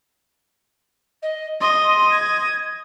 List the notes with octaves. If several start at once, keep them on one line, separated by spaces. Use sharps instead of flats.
D#5
D#5 C6
G#6